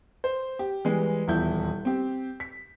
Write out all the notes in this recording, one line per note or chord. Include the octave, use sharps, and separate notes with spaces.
C5
G4
E3 G3 G#3
D#1 E2 E4 G6
C4 G4
B6